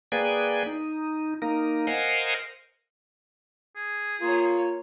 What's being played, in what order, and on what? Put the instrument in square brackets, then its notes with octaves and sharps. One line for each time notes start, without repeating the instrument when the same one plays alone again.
[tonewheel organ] A#3 G#4 B4 D5 G5 G#5
D#4
A#3 D#4 A#4
A#4 C5 D#5 F5 F#5 G#5
[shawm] G#4
[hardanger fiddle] A#3 C#5 [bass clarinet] F4